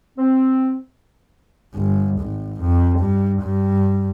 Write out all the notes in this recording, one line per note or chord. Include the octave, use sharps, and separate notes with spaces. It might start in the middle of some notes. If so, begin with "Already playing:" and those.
C4
G1
G#1
F2
G2
G2